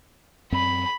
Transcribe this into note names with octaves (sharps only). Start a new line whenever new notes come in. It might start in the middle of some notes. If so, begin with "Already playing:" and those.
F#2 C4 B5